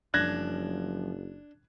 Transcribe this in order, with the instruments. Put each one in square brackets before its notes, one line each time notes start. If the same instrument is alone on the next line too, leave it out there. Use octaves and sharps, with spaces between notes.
[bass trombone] F#1 [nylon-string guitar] F#2 F3 G3 [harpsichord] D4 [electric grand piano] F#6 G#6 A#6